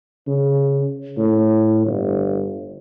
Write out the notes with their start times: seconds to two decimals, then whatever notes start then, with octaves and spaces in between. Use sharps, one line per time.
0.27 C#3
1.17 A2
1.86 G1